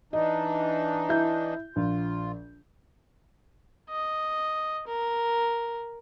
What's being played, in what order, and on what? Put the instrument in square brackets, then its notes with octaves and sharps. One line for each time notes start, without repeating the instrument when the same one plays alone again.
[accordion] E3 D4 D#4 [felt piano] D#5
[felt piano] E4 E5 G6
[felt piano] A#1 [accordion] F4
[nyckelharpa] D#5
A#4